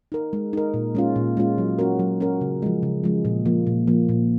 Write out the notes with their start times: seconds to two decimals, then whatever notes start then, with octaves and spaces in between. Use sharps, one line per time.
0.12 D#4 A#4
0.33 G#3
0.53 D#4 A#4
0.74 A#2
0.95 G#3 C#4 F4
1.16 A#2
1.37 G#3 C#4 F4
1.58 F#3
1.79 C#4 F#4 A#4
1.99 F#3
2.20 C#4 F#4 A#4
2.41 C#3
2.62 F3 G#3
2.83 C#3
3.04 F3 G#3
3.25 A#2
3.46 F3 A#3
3.67 A#2
3.87 F3 A#3
4.09 A#2